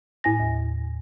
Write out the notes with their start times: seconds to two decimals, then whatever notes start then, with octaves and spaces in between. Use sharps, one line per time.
0.24 A2 E4 G#5 A#6
0.40 D#2